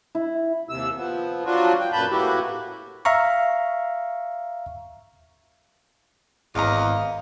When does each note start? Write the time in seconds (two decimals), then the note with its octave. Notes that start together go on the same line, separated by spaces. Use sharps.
0.15 E4
0.69 D#2 C3 E6
0.97 F3 B3
1.45 F3 F#3 D4 F4 F#4
1.80 G5
1.92 F#2 A#2 B4 A5 B5 G6
2.11 A2 A#3 B3 E4 F#4 G4
3.05 E5 F5 A#5 C#6
6.55 G#1 E2 D#5 F5 A#5